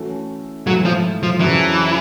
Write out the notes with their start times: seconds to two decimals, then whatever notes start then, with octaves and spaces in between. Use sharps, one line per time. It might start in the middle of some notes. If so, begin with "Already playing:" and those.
Already playing: E3 A3 C#4 F#4 A4
0.66 G#2 E3 F#3 A3
0.85 F3
1.23 F3
1.40 F2 C#3 E3 F#3